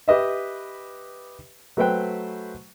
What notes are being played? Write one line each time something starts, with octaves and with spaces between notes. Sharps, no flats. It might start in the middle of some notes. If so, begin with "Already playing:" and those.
G4 B4 D#5 E5
F#3 A3 B4 C5 G5 F#6